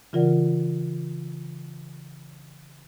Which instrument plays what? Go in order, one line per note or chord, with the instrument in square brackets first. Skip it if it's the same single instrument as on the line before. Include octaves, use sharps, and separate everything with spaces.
[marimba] C#3 E3 F4 A#4 D5 F#5